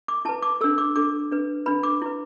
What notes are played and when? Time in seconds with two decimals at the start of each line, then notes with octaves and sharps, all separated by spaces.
0.08 D6
0.25 E4 B4 A5
0.42 D6
0.61 D4 A4 E6
0.78 D6
0.96 D4 A4 D6
1.31 D4 B4
1.66 D4 B4 B5
1.83 D6
2.02 E4 B4